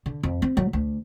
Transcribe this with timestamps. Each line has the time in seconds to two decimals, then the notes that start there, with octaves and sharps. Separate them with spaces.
0.06 D3
0.23 F2
0.42 C4
0.57 F#3
0.73 D2